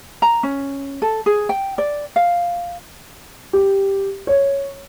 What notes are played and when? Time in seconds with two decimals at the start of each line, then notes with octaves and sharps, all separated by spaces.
0.22 A#5
0.43 C#4
1.02 A4
1.26 G#4
1.49 G5
1.78 D5
2.16 F5
3.53 G4
4.27 C#5